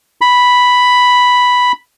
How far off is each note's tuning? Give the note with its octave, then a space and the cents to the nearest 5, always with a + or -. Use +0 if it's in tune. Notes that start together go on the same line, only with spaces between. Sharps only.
B5 +0